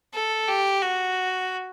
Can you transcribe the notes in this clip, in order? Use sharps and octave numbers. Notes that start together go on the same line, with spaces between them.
A4
G4
F#4